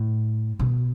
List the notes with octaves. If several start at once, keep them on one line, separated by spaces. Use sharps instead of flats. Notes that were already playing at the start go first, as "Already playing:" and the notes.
Already playing: A2
B2